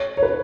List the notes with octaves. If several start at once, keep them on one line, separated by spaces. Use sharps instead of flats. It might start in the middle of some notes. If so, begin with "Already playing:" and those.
Already playing: C#5
C#5
B4